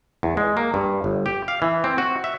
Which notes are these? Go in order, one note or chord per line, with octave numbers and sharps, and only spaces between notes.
E2
G#3
A#3
G2
G1
G4
F5
E3
C4
F#4
E5